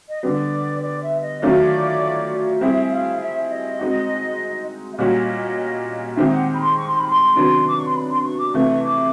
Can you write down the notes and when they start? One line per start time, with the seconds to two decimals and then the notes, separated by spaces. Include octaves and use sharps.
0.09 D#5
0.23 D3 G3 B3 D5
0.82 D5
1.02 E5
1.21 D#5
1.41 D#3 F#3 A3 C#4 F4 D5
2.60 G3 C4 E4 G#4 E5
2.91 F5
3.20 E5
3.45 E5
3.49 D#5
3.79 G#3 C4 D#4 F#4
4.93 E5
4.97 A#2 G3 A#3 C#4 F#4 D#5
6.16 D#3 G#3 C4 D#4 G4 E5
6.31 F#5
6.54 B5
6.62 C6
6.77 C#6
6.87 C6
6.98 B5
7.09 C6
7.35 C3 D#3 F#3 B3 D4
7.68 D6
7.77 C#6
7.86 C6
7.94 B5
8.10 C6
8.21 C6
8.24 C#6
8.39 D6
8.54 C3 E3 A3 C#6
8.72 C#6
8.84 D6